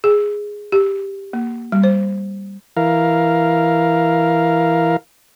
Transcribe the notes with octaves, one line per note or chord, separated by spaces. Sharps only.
G#4
G4
A#3
G3
C5
E3 A#4 F5